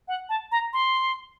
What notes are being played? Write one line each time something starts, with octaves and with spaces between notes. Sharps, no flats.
F#5
A5
A#5
C6